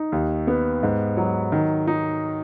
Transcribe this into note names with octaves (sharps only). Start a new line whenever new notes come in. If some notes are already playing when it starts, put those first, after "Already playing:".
Already playing: D#4
D#2
B3
G#2
F#3
D#3
D#4